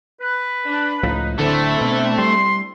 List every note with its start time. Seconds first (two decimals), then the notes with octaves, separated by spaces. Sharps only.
0.22 B4
0.67 D4
1.03 C#2 A2 F3 D#4
1.38 D1 D2 D3 A3 C4 D4 E4
1.81 B2
2.18 G3 C6